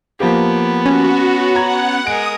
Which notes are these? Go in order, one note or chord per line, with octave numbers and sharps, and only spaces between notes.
F3 A#3 B3 G4
C#4 F#4
F#5 A#5 G#6
G#3 A#4 D#6 D7